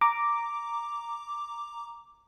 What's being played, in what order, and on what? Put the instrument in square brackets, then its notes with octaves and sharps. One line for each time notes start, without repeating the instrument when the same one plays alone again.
[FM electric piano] A#5 D6